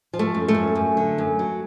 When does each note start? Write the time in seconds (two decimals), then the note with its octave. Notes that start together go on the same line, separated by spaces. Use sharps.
0.13 F3
0.19 A3
0.35 F#2
0.48 A3
0.54 F#2
0.75 F#2
0.97 D3
1.18 F#2
1.39 F#3